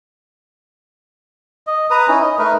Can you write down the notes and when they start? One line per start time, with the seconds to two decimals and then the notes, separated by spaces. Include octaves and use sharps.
1.67 D#5
1.91 B4 A#5 D#6
2.08 C#4 D#4 E4
2.22 D#5
2.39 A3 D#4 A#4 B4